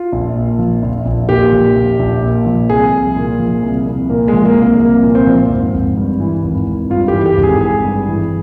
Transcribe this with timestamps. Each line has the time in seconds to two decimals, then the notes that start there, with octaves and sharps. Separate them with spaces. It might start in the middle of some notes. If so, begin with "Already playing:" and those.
Already playing: F4
0.12 A#1
0.36 A#2
0.59 F3
0.83 A#1
1.06 A#1
1.29 A#2 G4
1.52 F3
1.76 A#1
1.99 A#1
2.22 A#2
2.46 F3
2.69 C2 G#4
2.93 C2
3.16 A#2
3.39 F3
3.63 C2
3.86 C2
4.10 A#2 A#3
4.28 G#3
4.34 F3
4.45 A#3
4.57 C2
4.62 A#3
4.80 C2 A#3
5.03 A#2
5.15 C4
5.27 F3
5.50 G#1
5.74 G#1
5.97 G2
6.20 E3
6.43 G#1
6.67 G#1
6.90 G2 F4
7.08 G4
7.14 E3
7.26 G4
7.38 G#1
7.43 G#4
7.61 G#1 G#4
7.84 G2
8.08 E3